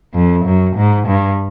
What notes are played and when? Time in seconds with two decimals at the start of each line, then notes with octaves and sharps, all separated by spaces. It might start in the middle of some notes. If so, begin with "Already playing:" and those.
0.14 F2
0.45 F#2
0.76 G#2
1.07 G2